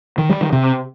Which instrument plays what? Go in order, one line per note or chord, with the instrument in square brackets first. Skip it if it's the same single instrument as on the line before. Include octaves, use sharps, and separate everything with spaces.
[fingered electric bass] D#3
G3
D#3
C3